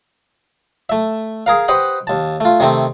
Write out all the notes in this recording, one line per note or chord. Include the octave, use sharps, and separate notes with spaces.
A3 E5
G#4 A#4 F5
G4 B4 C5 D#5 F#5
D#2 A5
A3 F4
C3 D#3 A3 C4